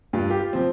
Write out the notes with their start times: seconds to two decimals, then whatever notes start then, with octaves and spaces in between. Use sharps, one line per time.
0.13 G2 F4
0.30 G4
0.39 F4
0.53 F3 C4